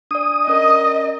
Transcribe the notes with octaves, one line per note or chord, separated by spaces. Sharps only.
D4 D5 D#6
C#4 A#4 D5 D#5